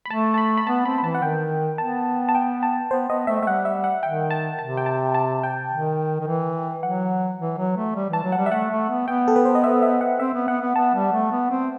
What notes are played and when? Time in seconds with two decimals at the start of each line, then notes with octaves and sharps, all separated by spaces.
0.06 B5
0.10 A3 A5
0.34 A5
0.38 B5
0.57 B5
0.66 B3 A5
0.85 C4 B5
0.98 B5
1.03 E3 A5
1.15 F#5
1.22 D#3 G5
1.78 B3 A5
2.29 A5
2.35 G5
2.63 A5
2.91 B3 C5
3.09 B3 D#5
3.27 A3 E5
3.41 A3 E5
3.47 G3 F#5
3.65 E5
3.84 F#5
4.03 D#3 G5
4.31 A5
4.59 C3 A5
4.77 G5
4.86 A5
5.14 A5
5.43 G5
5.71 D#3
6.20 D#3
6.27 E3
6.83 F#3 F#5
7.39 E3
7.58 F#3
7.76 A3
7.95 G3
8.10 E3 A5
8.23 F#3
8.32 G3 F#5
8.46 E5
8.51 A3 F#5
8.70 A3
8.89 B3
9.07 B3 G5
9.28 A4
9.36 B4
9.45 C5
9.55 D#5
9.64 E5
9.82 E5
10.01 F#5
10.20 C4 E5
10.34 B3
10.48 B3 F#5
10.62 B3
10.75 B3 A5
10.95 G3
11.13 A3
11.31 B3
11.50 C4